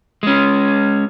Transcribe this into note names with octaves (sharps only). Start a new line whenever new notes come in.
G#3 C#4